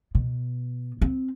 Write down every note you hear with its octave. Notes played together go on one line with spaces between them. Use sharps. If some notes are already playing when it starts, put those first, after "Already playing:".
B2
C4